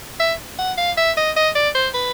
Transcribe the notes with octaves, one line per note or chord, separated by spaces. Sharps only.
E5
F#5
F5
E5
D#5
D#5
D5
C5
B4